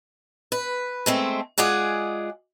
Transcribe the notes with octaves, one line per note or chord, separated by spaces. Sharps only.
B4
G#3 A3 C4
G#3 F4 G#4 D5 F#5